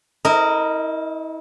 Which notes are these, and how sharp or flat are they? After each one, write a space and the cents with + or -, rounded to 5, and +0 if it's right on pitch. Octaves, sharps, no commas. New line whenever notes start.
E4 -40 A#4 -15 D#5 +0